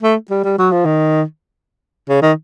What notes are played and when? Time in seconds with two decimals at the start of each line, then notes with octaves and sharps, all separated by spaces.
0.03 A3
0.31 G3
0.44 G3
0.58 F#3
0.72 F3
0.85 D#3
2.09 C#3
2.22 D#3